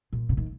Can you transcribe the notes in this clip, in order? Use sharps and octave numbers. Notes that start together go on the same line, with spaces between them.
A#2
C#3
D#3